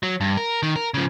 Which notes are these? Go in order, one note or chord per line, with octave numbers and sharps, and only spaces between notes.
F#3
G2
A#4
D#3
A#4
C#3 F3